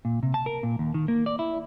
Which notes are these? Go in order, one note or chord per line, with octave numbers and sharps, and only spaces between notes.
A#2
C3
A5
A#4
A#2
D#2
D#3
A#3
D5
E4